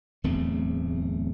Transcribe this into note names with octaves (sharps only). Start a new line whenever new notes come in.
D1 E2 A3 C4